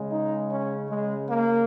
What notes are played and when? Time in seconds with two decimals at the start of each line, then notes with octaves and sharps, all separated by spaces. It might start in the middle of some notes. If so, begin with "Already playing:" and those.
Already playing: C#3 G#3
0.10 D#4
0.49 C#4
0.88 G#3
1.27 A#3